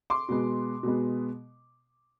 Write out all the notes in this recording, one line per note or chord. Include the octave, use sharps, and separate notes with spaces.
C6 D6
B2 G#3 B3
B2 G#3 B3